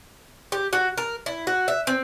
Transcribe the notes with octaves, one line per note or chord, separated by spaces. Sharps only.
G4
F#4
A#4
E4
F#4
E5
C4